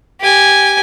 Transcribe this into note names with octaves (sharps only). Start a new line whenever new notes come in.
G4 G#5